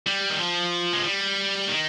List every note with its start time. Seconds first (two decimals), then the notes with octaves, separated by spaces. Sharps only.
0.07 G3
0.30 D#3
0.39 F3
0.93 G#3
1.04 G3
1.68 D#3